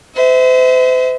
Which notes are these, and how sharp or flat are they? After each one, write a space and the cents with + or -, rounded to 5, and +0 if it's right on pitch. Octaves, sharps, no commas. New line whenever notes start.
C5 -40 E5 -35